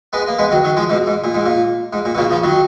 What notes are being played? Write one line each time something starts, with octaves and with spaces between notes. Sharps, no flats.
G#3 B3
A#3
G#3 B3
D#3 F#3
D#3 F#3
F3 G#3
G#2 B2
G#2
A#2
G#2
A#2
G#2
A#2
B2
A#2 C#3
C#3 F3
D#3 F#3